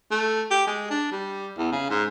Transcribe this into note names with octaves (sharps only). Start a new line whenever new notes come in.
A3
G4
G#3
D4
G3
E2
C#3
G#2